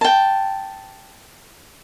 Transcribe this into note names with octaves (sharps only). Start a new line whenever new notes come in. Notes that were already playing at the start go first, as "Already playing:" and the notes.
G5 A5